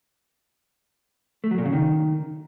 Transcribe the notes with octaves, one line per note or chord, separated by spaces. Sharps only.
A3
F#3
A#2
C#3
D#3